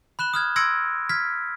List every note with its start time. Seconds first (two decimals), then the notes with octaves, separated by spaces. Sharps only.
0.19 B5 F#6 E7 G7
0.34 D#6 F6 G#6
0.56 C6 E6 G#6 A#6 C#7 D7
1.09 F6 G#6 B6